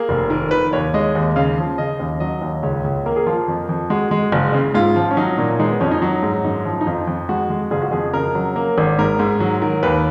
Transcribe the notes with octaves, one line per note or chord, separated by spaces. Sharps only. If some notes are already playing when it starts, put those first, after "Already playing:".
Already playing: A#3 G#4
F1
D#3
D#3 B4
D#2 C#5
G#3 D#5
D#2
C#3 F5
F3
C#3 D#5
D#2
F#3 D#5
D#2
C#2 C#5
C#2
A#3 A#4
G#4
F3 F4
F2
F2
G#3 F#4
G#3
F#1
C#3
G#2 F4
F3
C#4
F#3 D#4
A#2
G#3 D#4
B3
F2 C#4
D#4
F#3
G#2
F#2 D#4
F3
D#4
F2 F4
F2
G#3 F#4
G#3
F#1 G#4
F#4
F2 G#4
C#3 A#4
F#3
A#3
G#1
G#2 A#4
G#2
F#3
D#3
D#2 B4